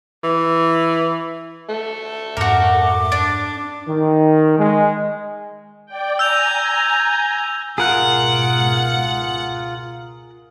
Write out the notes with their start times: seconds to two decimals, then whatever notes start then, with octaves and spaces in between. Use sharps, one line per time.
0.24 E3
1.69 A3
2.37 F2 G#2 C#4 F#4 A#4 D6
3.12 D4
3.88 D#3
4.58 G#3
5.86 D5 G5
6.19 G#5 A#5 E6 G6 F7
7.78 C#2 G#2 B2 F4 G#4 A#4 F#5 F#6